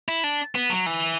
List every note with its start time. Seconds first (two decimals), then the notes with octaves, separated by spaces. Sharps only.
0.08 E4
0.24 D4
0.55 B3
0.70 F#3
0.86 E3